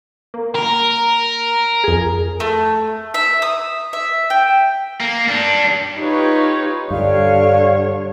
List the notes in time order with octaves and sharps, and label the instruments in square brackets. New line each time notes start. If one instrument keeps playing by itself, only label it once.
[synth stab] A#3
[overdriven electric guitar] A#4
[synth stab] F2 G#4
[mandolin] A3
E5
D#6
E5
G5
[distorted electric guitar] A#3
G3 D4
[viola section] D#4 F4 G4 B4 C#5
[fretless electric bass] G2 [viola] D3 C#5 [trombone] G3 [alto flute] F5